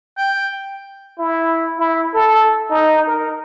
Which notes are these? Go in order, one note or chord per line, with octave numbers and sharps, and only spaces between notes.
G5
E4
E4
A4
D#4
A#4